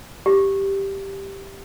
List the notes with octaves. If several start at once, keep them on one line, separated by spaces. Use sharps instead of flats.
G4